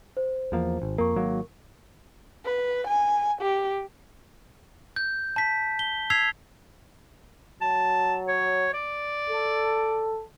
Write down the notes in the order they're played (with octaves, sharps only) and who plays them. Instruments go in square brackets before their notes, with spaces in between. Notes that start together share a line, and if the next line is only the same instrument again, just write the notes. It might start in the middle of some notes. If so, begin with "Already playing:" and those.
[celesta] C5
[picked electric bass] E2 F3 A#3
G#1
[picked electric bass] F2 A#3 [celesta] A#4 C#6
[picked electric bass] G#1 F#3 A#3
[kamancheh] B4
G#5
G4
[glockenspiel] G6
A5 B6
G7
E6 G#6 B6 C7 F7
[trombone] F#3 [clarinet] A5
[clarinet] C#5
D5
[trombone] A4